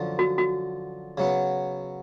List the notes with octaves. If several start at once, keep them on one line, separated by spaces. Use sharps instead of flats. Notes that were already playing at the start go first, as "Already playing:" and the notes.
Already playing: F#2 D3 F3
F#4
F#4
C#3 F#3 B3